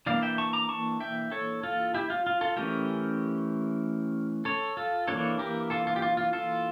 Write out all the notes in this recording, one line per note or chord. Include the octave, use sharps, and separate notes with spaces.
E3 A#3 D4 D5 F5
E5 G5
A5 C#6
A#5 D6
A5 C#6
E5 G5
A4 C#5
F4 A4
E4 G4
F4
F4
F4 A4
E3 A3 C#4 G4 A#4
A4 C#5
F4 A4
E3 A#3 D4 A4 C#5
G4 A#4
F4 A4
F4
G4
F4
F4
F4 A4